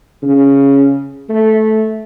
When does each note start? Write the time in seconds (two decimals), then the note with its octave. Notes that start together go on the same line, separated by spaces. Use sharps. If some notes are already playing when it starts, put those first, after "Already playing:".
0.23 C#3
1.29 A3